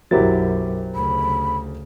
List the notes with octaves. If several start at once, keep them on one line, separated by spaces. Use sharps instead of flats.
B1 F#2 F#3 E4 G4 A#4 C5 A6
D2 C#3 B5